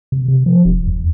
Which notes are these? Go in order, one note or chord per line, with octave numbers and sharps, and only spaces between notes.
C3
C3
F3
E1
E2